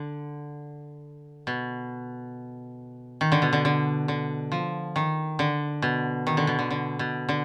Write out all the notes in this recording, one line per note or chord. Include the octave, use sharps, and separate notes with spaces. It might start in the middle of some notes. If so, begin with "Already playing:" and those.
Already playing: D3
B2
D#3
D3
B2
D3
D3
D3
F3
D#3
D3
B2
D#3
D3
B2
D3
D3
B2
D3